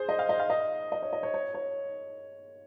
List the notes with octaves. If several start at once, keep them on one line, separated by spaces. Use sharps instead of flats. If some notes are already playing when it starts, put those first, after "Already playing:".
Already playing: G#4 C5
D#5
F5
D#5
F5
D#5
D#5
C#5
D#5
C#5
C#5
C#5